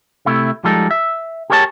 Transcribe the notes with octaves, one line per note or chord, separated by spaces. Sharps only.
C3 A3 E4
F3 G3 G#3 D#4 A4
E5
G4 G#4 A#4 C#5 D5 A5